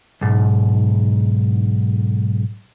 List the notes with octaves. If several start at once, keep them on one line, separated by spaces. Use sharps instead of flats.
B1 G#2